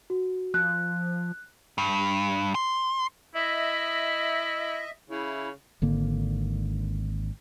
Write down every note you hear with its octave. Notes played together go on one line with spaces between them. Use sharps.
F#4
F3 F#6
G2
C6
E4 D#5 E5
C#3 E4
G#1 D3 A#3